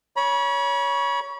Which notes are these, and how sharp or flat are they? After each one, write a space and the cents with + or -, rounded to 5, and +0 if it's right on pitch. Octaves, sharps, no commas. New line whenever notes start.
C#5 +15 B5 -35